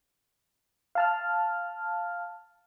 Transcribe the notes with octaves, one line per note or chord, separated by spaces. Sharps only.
F5 A5 F6